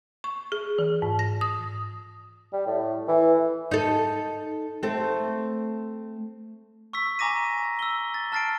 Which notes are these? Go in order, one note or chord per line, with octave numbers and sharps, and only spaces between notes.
C#6
G#4
E3
G#2
A#6
D#6
G3
A2
E3
D#4 A4
A3 C4
C#6 E6 B6
G#5 A#5 D6 A#6 D#7
E6 G7
A6
A5 F6 A6 C7 D7